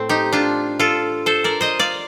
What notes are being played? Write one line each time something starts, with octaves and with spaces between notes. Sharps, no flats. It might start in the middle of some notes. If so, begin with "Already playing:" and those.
Already playing: A2 A3 C4
D#4 G4
D4 F4
F4 A4
A4 C5
A#4 D5
C5 D#5
D5 F5